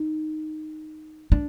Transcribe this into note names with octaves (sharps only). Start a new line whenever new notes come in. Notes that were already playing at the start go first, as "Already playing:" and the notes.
Already playing: D#4
D4